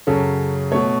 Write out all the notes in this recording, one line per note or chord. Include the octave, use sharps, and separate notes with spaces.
F#2 C#3 F#3 A4
B2 A3 C#5